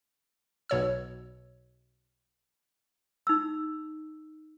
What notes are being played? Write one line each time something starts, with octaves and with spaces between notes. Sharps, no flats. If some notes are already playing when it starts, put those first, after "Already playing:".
B1 B2 C#5 E6
D#4 E6